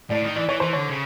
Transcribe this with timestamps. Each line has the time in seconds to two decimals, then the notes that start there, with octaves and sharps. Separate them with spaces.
0.10 A2 D5
0.23 D#3
0.36 E3 D5
0.49 E3 C#5
0.60 E3 C5
0.73 D3 C#5
0.89 C#3